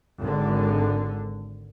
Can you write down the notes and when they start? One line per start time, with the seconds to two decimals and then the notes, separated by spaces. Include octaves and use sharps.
0.21 G#1 D3